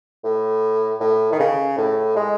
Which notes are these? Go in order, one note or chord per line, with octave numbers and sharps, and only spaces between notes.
A2
A2
D#3
C#3
A2
G#3